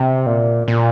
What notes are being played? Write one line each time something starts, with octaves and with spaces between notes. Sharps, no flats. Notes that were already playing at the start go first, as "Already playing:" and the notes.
Already playing: C3
A#2
A#2